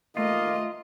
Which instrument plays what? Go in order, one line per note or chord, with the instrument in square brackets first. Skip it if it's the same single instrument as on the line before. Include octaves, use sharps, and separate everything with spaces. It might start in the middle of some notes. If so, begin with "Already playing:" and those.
[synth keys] A3 E5 [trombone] A#3 [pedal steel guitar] F4 [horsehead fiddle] D#5